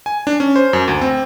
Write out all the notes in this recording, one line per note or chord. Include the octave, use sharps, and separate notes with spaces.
G#5
D4
C#4
C5
F#2
D2
C4